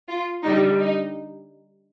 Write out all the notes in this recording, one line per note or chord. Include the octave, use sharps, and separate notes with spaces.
F4
D3 G3 D#4
D#4